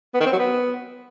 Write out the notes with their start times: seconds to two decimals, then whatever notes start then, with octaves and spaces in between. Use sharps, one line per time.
0.14 B3
0.20 D#3
0.26 C4
0.33 F#3
0.39 B3